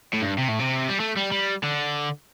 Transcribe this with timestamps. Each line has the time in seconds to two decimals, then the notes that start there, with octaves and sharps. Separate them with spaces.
0.14 A2
0.22 G2
0.38 C3
0.48 A2
0.59 C3
0.89 G3
1.00 A3
1.17 G3
1.32 G3
1.63 D3